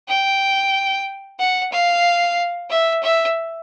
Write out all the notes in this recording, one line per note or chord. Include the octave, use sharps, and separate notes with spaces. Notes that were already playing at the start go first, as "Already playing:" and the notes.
G5
F#5
F5
E5
E5